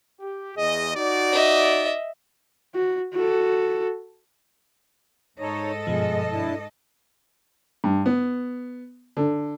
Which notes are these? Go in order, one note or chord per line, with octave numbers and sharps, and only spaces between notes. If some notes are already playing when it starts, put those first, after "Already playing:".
G4
E2 G#4 D#5
D#4 F#4 D5
D#5 E5
F#4
F#4 A4
G#2 D#4 A4 C#5 D#5
G2 B2 F3 G#3
D4 E4 A5
G2
B3
D3